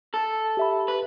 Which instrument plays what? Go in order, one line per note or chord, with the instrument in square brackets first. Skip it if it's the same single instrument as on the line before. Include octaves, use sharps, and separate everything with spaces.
[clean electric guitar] A4
[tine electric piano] G4 E5 B5
[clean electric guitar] B4